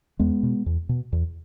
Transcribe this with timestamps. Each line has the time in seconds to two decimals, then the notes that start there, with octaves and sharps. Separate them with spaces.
0.19 E2 G#3 B3
0.43 B2
0.66 E2
0.89 B2
1.12 E2